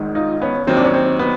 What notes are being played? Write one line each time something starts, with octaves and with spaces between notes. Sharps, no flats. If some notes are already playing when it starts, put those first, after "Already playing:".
Already playing: G#1 G#2 D#3
D#4 F4
B3 C#4
D#2 D#3 F#3 C4
D4
C#4
C4
B3